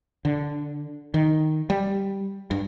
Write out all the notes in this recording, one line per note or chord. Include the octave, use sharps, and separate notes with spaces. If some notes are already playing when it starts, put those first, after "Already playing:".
D3
D#3
G3
G2